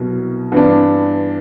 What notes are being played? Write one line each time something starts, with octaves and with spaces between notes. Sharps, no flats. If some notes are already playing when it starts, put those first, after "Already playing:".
Already playing: C2 B2 F#3
G2 E3 B3 D4